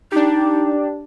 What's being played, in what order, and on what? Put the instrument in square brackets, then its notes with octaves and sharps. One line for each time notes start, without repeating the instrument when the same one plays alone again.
[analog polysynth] D4 G4 [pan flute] D#4